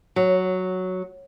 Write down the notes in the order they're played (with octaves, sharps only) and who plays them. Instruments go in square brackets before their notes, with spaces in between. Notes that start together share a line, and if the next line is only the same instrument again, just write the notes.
[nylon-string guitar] F#3